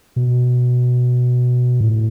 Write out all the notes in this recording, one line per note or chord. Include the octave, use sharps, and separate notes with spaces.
B2
A2